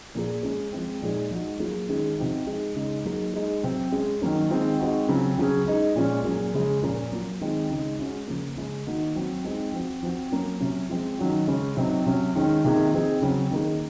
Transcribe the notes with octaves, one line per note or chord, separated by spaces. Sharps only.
A#2 F3 A#3 F4 G#4
G#3 C#4 G#4
F3 G#3 C4
A#2 F3 G#3 D#4 G#4
F3 G#3 D#4 F#4
F#3 A#3 F4 G#4
D#3 G#3 C#4 G#4
C3 F3 C4 D#4 F#4
G#3 D#4 G#4
C#3 G#3 D#4
F#3 A#3 D#4 G#4
G#3 D#4 G#4
C3 F#3 C4
G#3 C#4 G#4
D#3 F#3 A#3 C#4
D#3 G#3 C4 F4
G#3 C4 D#4 F#4
C#3 F#3 C4 F4
C#3 F#3 C#4 G#4
G#3 D#4 G#4
A#2 F3 G#3 C#4 F4
A#2 F#3 A#3 C#4 G#4
C#3 F3 G#3 C#4 G#4
A#2 F3 A#3 C#4
F#3 A#3 F4
D#3 G#3 C4 D#4
C#3 G#3 D#4
G#3 C#4 F#4
C#3 F3 A#3
C#3 G#3 C#4
D#3 A#3 D#4 F#4
F#3 C4 F#4
G#3 C4 D#4 G#4
F3 C4 F#4
F3 C4 F#4
F#3 A#3 C#4
C3 F#3 C#4
F3 G#3 C4
D#3 F#3 C#4 F#4
C#3 G#3 C#4
C3 F#3 C4 D#4
C3 F#3 C#4
D#3 G#3 C#4
C3 D#3 A#3 F4 G#4
F3 C4 D#4 G#4
C#3 F#3 C4 F#4
D#3 A#3 C#4 G#4